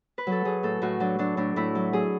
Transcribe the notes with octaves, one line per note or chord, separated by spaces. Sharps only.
B4
F#3 A4
F#3 G#4
A2 A4
A2 F#4
F#3 D4
F#3 D4
A2 D4
A2 E4
F#3
F#3 G#4